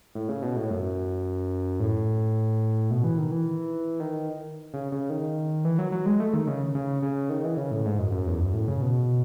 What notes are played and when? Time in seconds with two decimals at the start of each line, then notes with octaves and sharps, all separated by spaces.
0.15 A2
0.29 C#3
0.42 B2
0.56 A2
0.70 F#2
1.80 A2
2.90 B2
3.04 E3
3.18 D#3
3.31 E3
4.00 D#3
4.74 C#3
4.92 C#3
5.10 D#3
5.65 E3
5.79 F#3
5.92 F#3
6.06 G#3
6.20 A3
6.34 D#3
6.47 C#3
6.75 C#3
7.03 C#3
7.30 D#3
7.44 E3
7.57 C#3
7.71 A2
7.85 G#2
7.99 F#2
8.12 F#2
8.27 E2
8.40 F#2
8.53 A2
8.68 C#3
8.82 B2